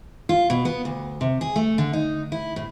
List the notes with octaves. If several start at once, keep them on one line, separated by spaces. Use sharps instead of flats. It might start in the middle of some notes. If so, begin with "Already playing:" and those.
F4
B2
B3
D2
C3
G#4
A3
D3
D#4
E4
A2